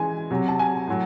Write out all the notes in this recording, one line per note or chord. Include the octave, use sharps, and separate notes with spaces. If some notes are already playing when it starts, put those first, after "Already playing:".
Already playing: C#3 E3 G#3 G#5
C3 F#3
A5
G#5
A2 F#3